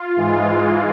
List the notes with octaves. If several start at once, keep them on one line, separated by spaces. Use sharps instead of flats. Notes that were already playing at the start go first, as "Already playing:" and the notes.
Already playing: F4
G#2 E3 G#3